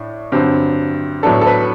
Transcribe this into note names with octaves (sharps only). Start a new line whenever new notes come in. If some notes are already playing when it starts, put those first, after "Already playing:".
Already playing: A2 D4
G2 D3 F#3 C4
A2 F#3 B3 D4 A4
A4
B4